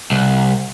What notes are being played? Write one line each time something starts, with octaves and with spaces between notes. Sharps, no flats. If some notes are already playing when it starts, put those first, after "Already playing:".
C2